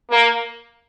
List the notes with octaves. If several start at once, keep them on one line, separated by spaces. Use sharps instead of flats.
A#3